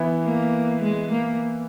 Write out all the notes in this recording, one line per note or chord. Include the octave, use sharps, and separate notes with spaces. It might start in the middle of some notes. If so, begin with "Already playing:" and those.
Already playing: E3 B3 E4
A#3
G#3
A#3